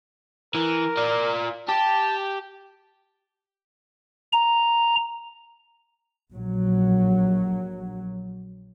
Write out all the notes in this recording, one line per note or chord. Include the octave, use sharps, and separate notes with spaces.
E3 A#4
F4 D5
G4 A5
A#5
A#1 F#3